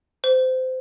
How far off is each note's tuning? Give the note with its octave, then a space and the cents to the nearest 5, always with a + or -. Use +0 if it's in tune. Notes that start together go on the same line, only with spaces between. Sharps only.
C5 -20